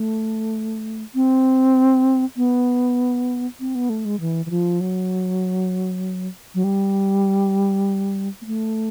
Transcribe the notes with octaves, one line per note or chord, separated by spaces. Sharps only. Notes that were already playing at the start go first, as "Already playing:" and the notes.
Already playing: A3
C4
B3
C4
B3
A3
G#3
E3
E3
F3
F#3
F#3
G3
A#3
A3